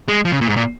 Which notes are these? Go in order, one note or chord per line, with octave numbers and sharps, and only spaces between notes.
G#3
F3
C#3
A#2
G#2
A#2